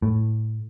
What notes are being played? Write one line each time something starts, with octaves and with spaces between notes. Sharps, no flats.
A2